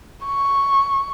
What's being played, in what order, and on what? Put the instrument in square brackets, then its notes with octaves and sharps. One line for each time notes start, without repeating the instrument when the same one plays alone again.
[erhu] C#6